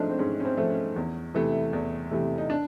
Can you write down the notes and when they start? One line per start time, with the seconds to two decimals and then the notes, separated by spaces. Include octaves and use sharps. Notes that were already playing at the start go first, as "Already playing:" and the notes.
Already playing: G#2 F3 A3 D4 D#4
0.09 C4
0.19 G#2 C#4
0.40 C#4
0.45 C4
0.57 F3 A3
0.70 C#4
0.96 E2
1.34 C3 E3 A3
1.73 E2
2.11 C3 E3 A3
2.38 D#4
2.50 D4